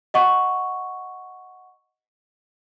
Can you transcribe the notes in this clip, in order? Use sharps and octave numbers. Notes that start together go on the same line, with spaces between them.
D#5 F#5 C#6